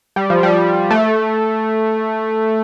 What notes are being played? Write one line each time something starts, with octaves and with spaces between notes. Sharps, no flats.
G3
F3
G3
A3